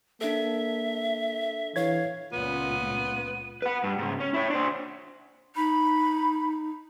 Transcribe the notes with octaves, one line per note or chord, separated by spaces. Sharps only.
A#3 D4 A4 E5
E3 C#5 F5 G#6
C#2 A#2 B3 F4 D#7
B4 F#5
G2
G#2 C#3
C#4
E4 C#5
D4 C5
D#4 B5